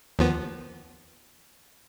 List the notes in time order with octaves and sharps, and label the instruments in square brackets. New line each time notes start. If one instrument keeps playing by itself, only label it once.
[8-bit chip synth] D#2 F3 B3